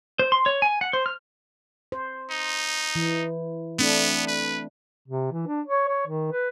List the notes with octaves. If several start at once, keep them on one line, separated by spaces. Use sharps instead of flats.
C5
C6
C#5
G#5
F#5
C5
F6
C5
D#4
E3
A3 B3 C4 D4
B4
C3
E3
D4
C#5
C#5
D#3
B4